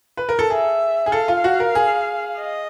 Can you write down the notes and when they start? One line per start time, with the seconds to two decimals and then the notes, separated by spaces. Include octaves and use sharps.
0.17 B4
0.29 A#4
0.39 A4
0.50 G#4 E5
1.06 G#4
1.12 A4 F5
1.28 F4
1.44 F#4
1.60 A#4
1.75 G#4
2.38 D#5